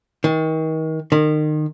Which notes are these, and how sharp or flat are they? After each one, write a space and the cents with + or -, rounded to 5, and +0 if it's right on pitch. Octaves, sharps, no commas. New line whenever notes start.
D#3 +35
D#3 -30